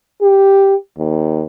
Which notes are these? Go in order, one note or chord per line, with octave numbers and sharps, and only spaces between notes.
G4
D#2